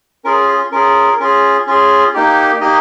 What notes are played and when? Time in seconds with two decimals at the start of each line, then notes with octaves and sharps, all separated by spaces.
0.24 C#4 F4 G#4 A#4
0.49 G#4
0.72 C#4 F4 G#4 A#4
1.20 C#4 F4 G#4
1.66 C#4 F4 G#4
2.14 A#3 D#4 G4
2.61 A#3 D#4 G4 D#5